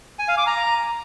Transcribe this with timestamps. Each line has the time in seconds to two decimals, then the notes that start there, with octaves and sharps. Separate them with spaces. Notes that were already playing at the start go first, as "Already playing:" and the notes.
0.19 G#5
0.28 F5
0.38 D6
0.47 A#5